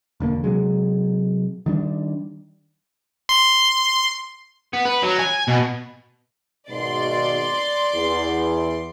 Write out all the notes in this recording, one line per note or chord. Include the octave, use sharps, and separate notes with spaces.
E1 D3 A#3
C3 F#3 G#3
D#3 G3 D4
C6
B3
B4
F#3
G#5
B2
G#1 B2 D5 C6
E2